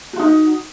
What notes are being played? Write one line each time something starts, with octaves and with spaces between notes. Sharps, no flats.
D#4 F4 F#4